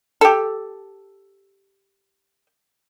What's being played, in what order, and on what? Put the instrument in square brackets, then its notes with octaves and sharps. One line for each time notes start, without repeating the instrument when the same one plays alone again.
[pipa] G4 A4